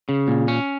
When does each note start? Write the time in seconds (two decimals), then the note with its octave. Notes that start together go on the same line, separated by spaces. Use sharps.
0.09 C#3
0.28 A#2
0.48 C#4